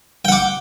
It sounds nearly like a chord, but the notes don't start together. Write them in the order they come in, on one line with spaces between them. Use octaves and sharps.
G5 F#5 D6